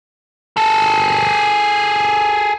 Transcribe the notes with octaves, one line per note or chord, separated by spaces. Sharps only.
G#4 A4